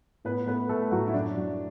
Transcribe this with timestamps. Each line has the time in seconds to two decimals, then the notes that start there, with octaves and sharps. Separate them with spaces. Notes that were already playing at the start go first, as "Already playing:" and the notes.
0.25 A2 B3 B4
0.47 A3 B3 B4
0.69 A3 A4
0.91 A2 F#3 F#4
1.08 E4
1.14 F#2 D4
1.37 F#3